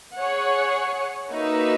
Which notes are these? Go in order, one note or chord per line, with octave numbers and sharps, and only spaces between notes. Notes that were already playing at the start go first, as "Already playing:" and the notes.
G#4 C#5 F#5
A#3 D#4 F#4 B4 E5